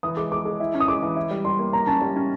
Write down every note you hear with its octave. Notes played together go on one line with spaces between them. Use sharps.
E3 D#6
G#3 D6
G#3 D6
G#3
E4
C#4
D#6
G#3 D6
E3
E4
G3
G3 C6
A#3
A#3 A#5
C#4 A5
G3
C#4